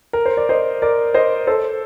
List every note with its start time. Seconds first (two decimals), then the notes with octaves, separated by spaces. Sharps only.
0.13 A#4
0.26 C5
0.37 D5
0.49 C5 D#5
0.82 A#4 D5
1.14 C5 D#5
1.47 A4 C5